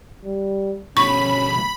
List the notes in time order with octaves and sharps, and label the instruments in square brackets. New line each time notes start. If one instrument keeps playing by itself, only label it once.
[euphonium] G3
[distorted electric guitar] G2 B2 [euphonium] C#4 [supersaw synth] B5 [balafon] C#6